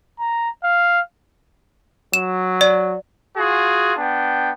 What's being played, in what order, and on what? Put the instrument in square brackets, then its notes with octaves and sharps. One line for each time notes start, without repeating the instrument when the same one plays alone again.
[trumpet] A#5
F5
[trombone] F#3 [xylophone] E7
[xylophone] D5
[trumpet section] F4 F#4 G#4
B3 D4 G5